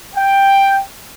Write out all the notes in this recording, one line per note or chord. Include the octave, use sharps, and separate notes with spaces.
G5